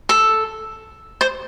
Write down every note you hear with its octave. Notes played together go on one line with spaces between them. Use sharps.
A4
C5